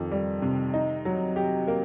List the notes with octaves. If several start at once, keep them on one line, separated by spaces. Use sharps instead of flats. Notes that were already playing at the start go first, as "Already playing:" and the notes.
Already playing: F2 D#3
G3
C3
D#4
F#3
G4
A#3